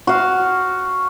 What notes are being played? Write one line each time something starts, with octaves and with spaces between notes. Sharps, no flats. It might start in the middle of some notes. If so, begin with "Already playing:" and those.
F#4 F5